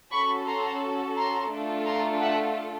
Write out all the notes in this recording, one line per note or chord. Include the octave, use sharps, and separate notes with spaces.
C#4 F#4 A4 B5 C#6
A#5 C6
A#5 C6
A3 D4 F4 A4
A#5 C6
E5 F#5